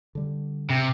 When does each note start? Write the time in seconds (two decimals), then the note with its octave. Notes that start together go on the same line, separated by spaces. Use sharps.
0.15 D3 G3
0.70 C3